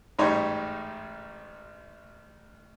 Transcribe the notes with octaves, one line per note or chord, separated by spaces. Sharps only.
A1 G#2 G3 D#4 C#5